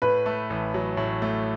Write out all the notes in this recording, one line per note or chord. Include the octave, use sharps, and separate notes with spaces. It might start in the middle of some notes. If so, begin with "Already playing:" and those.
A2 B4
A3
A1
F#3
A2
A3